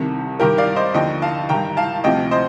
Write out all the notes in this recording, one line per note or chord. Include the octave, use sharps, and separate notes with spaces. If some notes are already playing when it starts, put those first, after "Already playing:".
Already playing: C2 C3 D#3 A4
G2 D#3 G4 A#4
D5 F5
C5 D#5
D#2 D3 F3 D#5 G5
F5 A5
G2 D#3 G5 A#5
F5 A5
D2 C3 F3 D#5 G5
C5 D#5